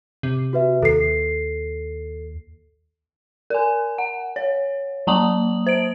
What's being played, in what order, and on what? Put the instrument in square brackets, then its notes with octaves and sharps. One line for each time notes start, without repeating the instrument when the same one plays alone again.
[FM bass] C3
[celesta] F#4 B4 E5
[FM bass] D#2 [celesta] A4 C7
[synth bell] A#4 G#5
F#5
C#5
F#3 A#3 A5 A#5 D#6 F#7
C5 D7